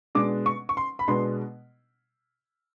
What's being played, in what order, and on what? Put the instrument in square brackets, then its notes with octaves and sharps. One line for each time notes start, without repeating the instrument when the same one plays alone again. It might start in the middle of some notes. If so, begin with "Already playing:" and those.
[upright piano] B2 G#3 B3 D4 D6
C#6
C#6
C6
B5
B2 G#3 B3 D4 C6